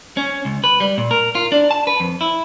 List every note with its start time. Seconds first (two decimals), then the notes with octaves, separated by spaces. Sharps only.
0.17 C#4
0.45 C#2
0.64 B4
0.80 G3
0.98 A#2
1.11 A#4
1.35 F4
1.52 D4
1.71 A5
1.87 B4
2.00 F2
2.21 E4